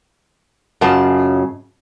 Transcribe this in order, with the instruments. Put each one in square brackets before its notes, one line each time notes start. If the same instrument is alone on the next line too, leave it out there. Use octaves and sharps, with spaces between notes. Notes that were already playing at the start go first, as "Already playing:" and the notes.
[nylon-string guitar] F#2 C#3 F4 D#5 A5